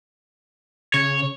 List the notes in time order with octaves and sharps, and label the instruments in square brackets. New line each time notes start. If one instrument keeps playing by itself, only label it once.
[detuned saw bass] C#3 [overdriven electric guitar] C#5